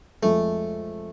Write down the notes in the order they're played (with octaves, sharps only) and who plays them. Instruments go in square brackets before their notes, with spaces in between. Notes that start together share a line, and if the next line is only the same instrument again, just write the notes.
[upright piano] F2 F3 G#3 [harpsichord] A3